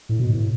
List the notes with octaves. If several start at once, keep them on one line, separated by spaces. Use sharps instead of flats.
A2
B2
A2